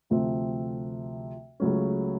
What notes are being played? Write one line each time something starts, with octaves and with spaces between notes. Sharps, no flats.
D2 C3 F3 A3 C4
C#2 C#3 F#3 A3 C#4